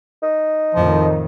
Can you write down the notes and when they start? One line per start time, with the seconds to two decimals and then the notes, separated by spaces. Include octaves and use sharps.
0.23 D#4
0.75 F2 A2 D#3 F3